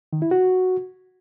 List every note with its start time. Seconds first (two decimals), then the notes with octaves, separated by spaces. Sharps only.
0.13 D#3
0.22 E4
0.31 F#4